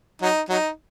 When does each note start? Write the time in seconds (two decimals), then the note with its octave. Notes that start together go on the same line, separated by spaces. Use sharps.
0.22 F#3 D#4
0.49 F#3 D#4